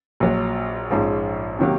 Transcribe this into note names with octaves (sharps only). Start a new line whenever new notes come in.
A#1 A#2 F#3
A#1 G#2 F3 G#3 C#4
C3 D#3 F#3 A#3